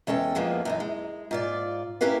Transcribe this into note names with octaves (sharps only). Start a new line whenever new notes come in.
E2 G#3 C#4 A4 G5
F2 F3 G#3 A#3 B3
F#2 E3 D#4
G#3
G#2 F4 D5
C#4 E4 G4 A#4 B4 F5